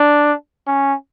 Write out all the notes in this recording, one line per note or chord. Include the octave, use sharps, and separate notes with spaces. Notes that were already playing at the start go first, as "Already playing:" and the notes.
Already playing: D4
C#4